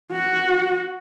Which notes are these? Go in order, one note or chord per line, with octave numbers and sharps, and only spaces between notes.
F#4